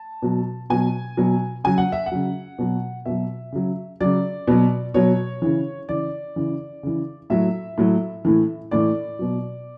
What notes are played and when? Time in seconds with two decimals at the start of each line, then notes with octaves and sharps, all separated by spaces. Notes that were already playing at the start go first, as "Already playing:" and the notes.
Already playing: A5
0.22 B2 F#3
0.70 B2 F#3 G#5
1.17 B2 F#3
1.64 C#3 F#3 G#5
1.78 F#5
1.92 E5
2.06 F#5
2.12 C#3 F#3
2.59 B2 F#3
3.06 B2 F#3 E5
3.52 C#3 F#3
4.01 C#3 F#3 D5
4.48 B2 F#3
4.94 B2 F#3 C#5
5.42 C#3 E3
5.89 C#3 E3 D5
6.36 C#3 E3
6.83 C#3 E3
7.30 A2 F#3 E5
7.78 A2 F#3
8.25 A2 E3
8.71 A2 E3 D5
9.19 B2 F#3